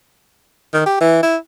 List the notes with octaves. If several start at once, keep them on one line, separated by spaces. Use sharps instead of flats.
D#3
G4
E3
E4